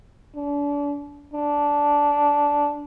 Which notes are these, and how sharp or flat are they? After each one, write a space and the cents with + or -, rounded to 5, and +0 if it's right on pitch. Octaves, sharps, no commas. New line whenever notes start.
D4 -35
D4 -10